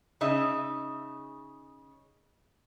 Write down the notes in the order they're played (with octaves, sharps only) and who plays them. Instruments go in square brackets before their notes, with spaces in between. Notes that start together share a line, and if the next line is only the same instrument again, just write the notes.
[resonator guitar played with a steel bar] C#3 D#4 E5